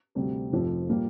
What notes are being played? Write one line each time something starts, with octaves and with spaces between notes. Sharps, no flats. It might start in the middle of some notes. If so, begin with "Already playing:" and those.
D2 C3 G3 C4
F1 F2 F3
A#2 G3 A#3